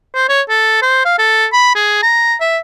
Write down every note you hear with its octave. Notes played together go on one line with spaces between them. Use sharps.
C5
C#5
A4
C5
F5
A4
B5
G#4
A#5
E5